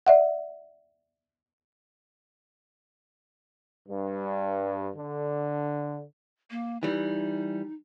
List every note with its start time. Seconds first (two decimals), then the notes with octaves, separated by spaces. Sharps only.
0.07 D5 E5 F#5
3.88 G2
4.96 D3
6.51 A#3
6.83 E3 G3 D#4